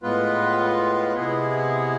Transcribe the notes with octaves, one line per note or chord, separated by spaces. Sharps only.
A2 G#3 B3 F4 B4
C3 G#3 B3 E4 G#4